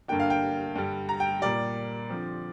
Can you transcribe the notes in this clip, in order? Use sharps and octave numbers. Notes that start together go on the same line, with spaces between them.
G2 D3 A#3 D4 G5
F5
G5
G2 D3 G3
A#5
G5
A#2 G3 A#3 D5
D3 F3 C4